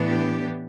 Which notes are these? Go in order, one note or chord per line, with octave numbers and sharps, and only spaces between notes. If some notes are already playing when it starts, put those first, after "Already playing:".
Already playing: A2 E3 B3 D4
G4